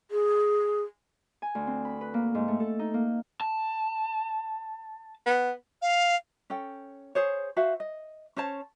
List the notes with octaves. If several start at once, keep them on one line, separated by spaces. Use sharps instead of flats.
G#4
G#5
D2
C4
B5
B4
A#3
G#2
A3
A4
D#4
A#3
A5
B3
F5
C#4 A4 G5
G#4 C5 C#5
F#4 C5 E5 F5
D#5
C#4 C5 C#5 A5